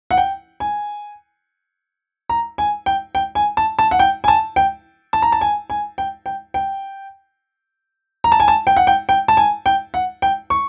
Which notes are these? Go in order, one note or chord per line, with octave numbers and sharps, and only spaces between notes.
F#5
G5
G#5
A#5
G#5
G5
G5
G#5
A5
A5
F#5
G5
G#5
A5
G5
A5
A#5
A5
G#5
G#5
G5
G5
G5
A#5
A5
G#5
A5
G5
F#5
G5
G5
A5
G#5
G5
F#5
G5
C#6